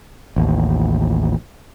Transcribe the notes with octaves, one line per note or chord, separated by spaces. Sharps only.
A1 D#2